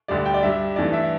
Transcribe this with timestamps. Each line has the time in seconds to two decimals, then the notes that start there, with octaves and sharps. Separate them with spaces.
0.08 D2 D3 G3 D5
0.26 G5
0.34 D5
0.43 G2 G3 E5
0.76 G2 E3 A3 D5
0.93 E5